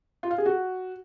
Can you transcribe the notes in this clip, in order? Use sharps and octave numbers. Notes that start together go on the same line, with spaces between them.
F4
F5
G#4
F#4